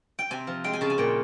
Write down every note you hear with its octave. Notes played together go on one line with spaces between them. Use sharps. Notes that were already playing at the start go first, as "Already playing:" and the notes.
G5
C3 G#5
F3
G#3 G5
G#5
C#3 A5
G#5
A#2 G5